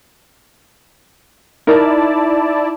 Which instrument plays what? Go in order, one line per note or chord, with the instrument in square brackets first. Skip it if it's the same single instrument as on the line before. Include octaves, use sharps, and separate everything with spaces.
[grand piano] D#4 [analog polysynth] E4 D5 A5 [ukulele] A#4